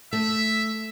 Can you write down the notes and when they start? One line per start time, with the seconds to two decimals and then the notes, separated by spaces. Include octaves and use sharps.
0.13 A3 E5